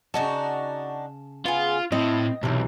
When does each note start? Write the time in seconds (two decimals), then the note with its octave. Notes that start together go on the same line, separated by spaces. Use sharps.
0.14 C#3 D4 D#4 F#4 A5
1.46 B3 F4 G#4
1.92 A2 C4 D#5
2.43 B1 C3 E3